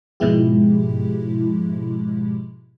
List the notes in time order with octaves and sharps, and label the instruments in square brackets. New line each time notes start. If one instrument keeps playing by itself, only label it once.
[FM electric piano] G#2 B2 F3 G#3 E4 G4